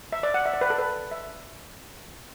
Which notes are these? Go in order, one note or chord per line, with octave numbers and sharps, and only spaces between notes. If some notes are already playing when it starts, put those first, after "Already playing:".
E5
D5
F#5
E5
D5
B4
A4
B4
E5